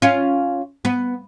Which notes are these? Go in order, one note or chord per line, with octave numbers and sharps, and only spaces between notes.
C#4 F4
B3